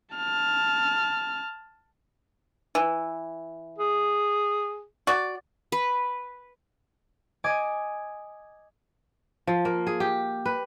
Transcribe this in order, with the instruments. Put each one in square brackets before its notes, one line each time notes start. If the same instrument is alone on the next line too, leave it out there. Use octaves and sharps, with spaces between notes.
[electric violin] A5 F6
[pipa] E3
[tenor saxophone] G#4
[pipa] F#4 D5
[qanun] B4
[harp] D#5 G#5 D6 G#6
[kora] F3
A#3
G#4
G4
B4